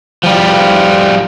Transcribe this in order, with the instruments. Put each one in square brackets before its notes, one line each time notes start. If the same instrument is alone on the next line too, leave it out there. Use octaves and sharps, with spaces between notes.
[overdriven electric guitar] F3 G3